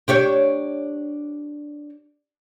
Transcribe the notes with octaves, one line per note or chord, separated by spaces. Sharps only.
D4 G4 C#5